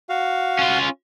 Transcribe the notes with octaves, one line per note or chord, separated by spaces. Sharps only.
F#4 F5
C#4 F4